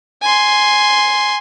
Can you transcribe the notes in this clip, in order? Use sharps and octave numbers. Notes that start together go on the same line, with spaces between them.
G#5 C6